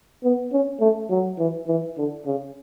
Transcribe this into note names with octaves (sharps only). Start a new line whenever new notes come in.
B3
C#4
A3
F#3
E3
E3
D3
C#3